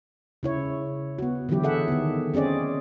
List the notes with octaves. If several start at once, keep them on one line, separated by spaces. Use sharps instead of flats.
C#3 E4 C#5
B3 F#4
D3 E3 F#3 E4 G4
G#4 A4 E5 F#5
D#3 B3
C4 C#4 G#4 D5 D#5